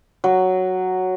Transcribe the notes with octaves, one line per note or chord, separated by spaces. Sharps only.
F#3